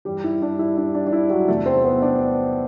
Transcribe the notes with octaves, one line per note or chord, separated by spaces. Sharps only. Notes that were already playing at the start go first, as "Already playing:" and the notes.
G2 E3 G3 G4
E4
D4
E4
D4
D4
D4
E4
F#3 F#4
E2 C3 E3 A3 A4
C4 C5
B3 B4
D4 D5